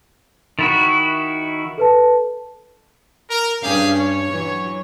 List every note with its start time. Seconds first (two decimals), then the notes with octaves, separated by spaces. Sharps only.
0.59 D#3 E4 F#4 A6
1.78 A4 B4 A5
3.28 A#4
3.62 G2 C#4 G4 G#4 F5
3.97 C#5
4.32 E3 F#3